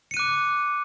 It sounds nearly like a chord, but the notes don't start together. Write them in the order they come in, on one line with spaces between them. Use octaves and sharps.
C#7 D#7 F#6 D6